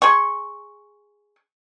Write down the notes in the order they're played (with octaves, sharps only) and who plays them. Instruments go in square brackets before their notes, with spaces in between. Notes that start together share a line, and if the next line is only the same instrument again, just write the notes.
[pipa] G#4 C6 C#6